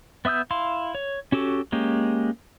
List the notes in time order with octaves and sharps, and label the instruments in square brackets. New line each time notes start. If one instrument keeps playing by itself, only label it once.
[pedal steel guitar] B3 E5 D#6 E6 G6
E4 F5 C6
C#5
C#4 F#4 G4 A4
G#3 A#3 C#4 G4